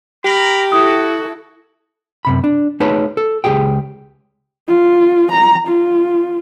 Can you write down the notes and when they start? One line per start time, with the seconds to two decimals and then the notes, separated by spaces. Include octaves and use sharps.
0.25 G4 A#4 A#5 B5
0.72 E4 F#4 A4 D#6
2.25 F#2 C3 B5
2.44 D4
2.80 A3 D#4 G#4 B4 C#5 A5
3.17 A4
3.44 C#2 E3 G4 G#4 G5
4.68 F4
5.32 A#5
5.68 F4